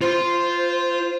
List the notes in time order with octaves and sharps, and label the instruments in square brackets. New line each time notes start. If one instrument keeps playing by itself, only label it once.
[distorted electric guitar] F4 C6 [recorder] C5